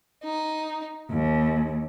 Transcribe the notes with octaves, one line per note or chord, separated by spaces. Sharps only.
D#4
D#2